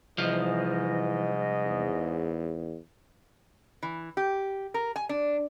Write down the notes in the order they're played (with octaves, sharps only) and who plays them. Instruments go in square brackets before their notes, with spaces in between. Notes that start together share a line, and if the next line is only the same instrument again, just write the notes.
[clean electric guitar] C2 F3 [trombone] G#2 [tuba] E3 [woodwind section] D#5
[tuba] E2
[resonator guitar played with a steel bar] E3
G4
A#4
G#5
D4